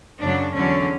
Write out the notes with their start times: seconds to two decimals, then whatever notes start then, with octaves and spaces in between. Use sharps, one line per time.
0.21 F#2 C#3 F#3 D4
0.54 E2 D3 F#3 C#4